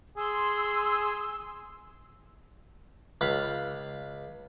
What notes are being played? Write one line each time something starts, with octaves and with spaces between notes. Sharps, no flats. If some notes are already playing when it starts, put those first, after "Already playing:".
G#4 C6 E6
C#2 F5 B5